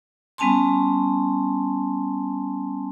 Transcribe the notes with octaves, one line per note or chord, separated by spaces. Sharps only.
G3 B3 C#4 G#5 A5 C6